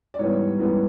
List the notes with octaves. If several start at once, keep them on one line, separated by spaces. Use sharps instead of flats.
D5
G#2 E3 G3 B3 C#5
G#2 E3 G3 B3